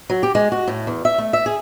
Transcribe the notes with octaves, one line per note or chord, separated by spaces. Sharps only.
F#3
G4
G#3
F#4
A2
E2
E5
A3
E5
G#4